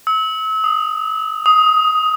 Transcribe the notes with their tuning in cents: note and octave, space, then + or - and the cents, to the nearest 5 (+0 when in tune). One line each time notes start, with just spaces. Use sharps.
E6 -35
D#6 -5
D#6 +10